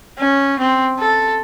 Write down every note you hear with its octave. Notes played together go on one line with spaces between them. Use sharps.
C#4
C4
A4